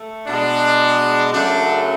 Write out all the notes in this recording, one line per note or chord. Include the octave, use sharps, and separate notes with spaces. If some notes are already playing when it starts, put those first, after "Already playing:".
Already playing: A3
B2 G#3 D4
F#2 C#3 F#3 A3 D4